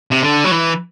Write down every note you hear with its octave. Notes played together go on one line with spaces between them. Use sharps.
C3
D3
F#3
E3